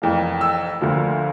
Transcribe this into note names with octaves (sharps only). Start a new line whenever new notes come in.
F1 F2 E3 A#3
E6
D2 D3 F3 A#3